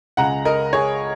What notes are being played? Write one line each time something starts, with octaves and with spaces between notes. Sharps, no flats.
C#2 C#3 G#3 F#5 A#5
A#4 D#5
G#4 C#5